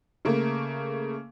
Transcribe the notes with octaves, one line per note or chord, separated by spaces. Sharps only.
C#3 A3 A#3